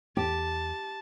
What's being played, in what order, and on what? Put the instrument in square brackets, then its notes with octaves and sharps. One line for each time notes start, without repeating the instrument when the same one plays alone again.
[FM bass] E2 [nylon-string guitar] G4 [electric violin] A5